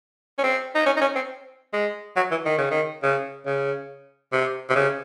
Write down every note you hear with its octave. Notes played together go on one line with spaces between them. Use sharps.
C#4
C4
D#4
C#4
D#4
C#4
C4
G#3
F#3
E3
D#3
C#3
D#3
C#3
C#3
C3
C3
C#3